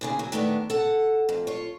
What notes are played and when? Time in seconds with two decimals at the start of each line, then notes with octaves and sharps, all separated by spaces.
0.01 D#2 C#3 G#4
0.19 F#3
0.32 D#3 A3 B3 D4
0.70 A4 F#5
1.29 F2
1.47 F4 C#5